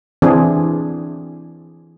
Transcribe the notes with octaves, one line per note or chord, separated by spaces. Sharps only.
E3 C4 D4 G#4